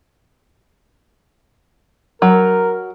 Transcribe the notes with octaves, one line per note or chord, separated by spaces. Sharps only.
F#3 A#4